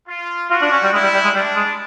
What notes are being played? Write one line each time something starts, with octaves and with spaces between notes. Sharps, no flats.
F4
F4 F#4
D4
C#4
G3
G#3 E4
G3
G3
G#3
G3 D4
G#3